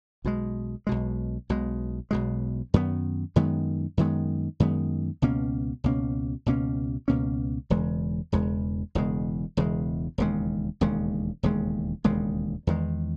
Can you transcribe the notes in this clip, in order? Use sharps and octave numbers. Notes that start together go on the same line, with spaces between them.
B1 B2 G#3
B1 B2 G#3
B1 B2 G#3
B1 B2 G#3
F#2 D#3 G#3 B3
F#2 D#3 G#3 B3
F#2 D#3 G#3 B3
F#2 D#3 G#3 B3
C#2 B2 A#3 C#4
C#2 B2 A#3 C#4
C#2 B2 A#3 C#4
C#2 B2 A#3 C#4
E1 E2 C#3 G#3
E1 E2 C#3 G#3
E1 E2 C#3 G#3
E1 E2 C#3 G#3
E1 D#2 C#3 G#3
E1 D#2 C#3 G#3
E1 D#2 C#3 G#3
E1 D#2 C#3 G#3
E2 D#3 G#3